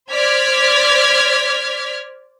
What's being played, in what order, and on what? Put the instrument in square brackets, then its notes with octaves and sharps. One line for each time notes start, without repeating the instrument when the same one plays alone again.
[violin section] C5 D5 F6 G#6 B6